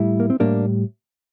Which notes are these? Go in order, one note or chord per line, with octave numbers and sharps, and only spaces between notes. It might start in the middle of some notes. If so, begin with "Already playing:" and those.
Already playing: A2 G3 E4
A#3
C4
A2 G3 A#3 D4